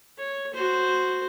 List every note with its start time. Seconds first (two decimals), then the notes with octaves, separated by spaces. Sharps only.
0.18 C#5
0.54 F#4 C5